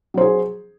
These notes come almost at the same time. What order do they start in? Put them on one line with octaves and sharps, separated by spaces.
F#3 C5 G#4